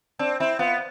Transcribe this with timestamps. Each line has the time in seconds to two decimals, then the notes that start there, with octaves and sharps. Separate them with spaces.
0.19 C4 D4
0.40 C4 E4
0.59 B3 F4